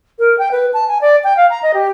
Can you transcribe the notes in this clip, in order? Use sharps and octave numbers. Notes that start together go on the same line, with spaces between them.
A#4
G5
B4
A5
G#5
D5
G5
F5
A#5
D#5
G4